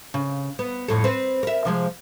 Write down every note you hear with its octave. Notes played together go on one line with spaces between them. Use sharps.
C#3
B3
F2 A2 A4
C4 B4
A#4 E5
C3 F3 G#3